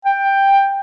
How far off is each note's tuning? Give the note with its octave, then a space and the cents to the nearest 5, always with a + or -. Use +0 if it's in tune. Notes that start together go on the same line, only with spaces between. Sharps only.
G5 +10